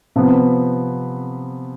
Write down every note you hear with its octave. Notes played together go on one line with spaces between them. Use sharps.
C3 F3 B3